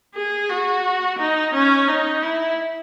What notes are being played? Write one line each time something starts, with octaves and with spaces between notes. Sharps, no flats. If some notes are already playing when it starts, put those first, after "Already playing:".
G#4
F#4
D#4
C#4
D#4
E4